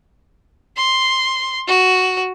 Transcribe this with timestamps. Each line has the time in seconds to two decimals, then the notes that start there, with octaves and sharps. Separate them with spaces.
0.77 C6
1.67 F#4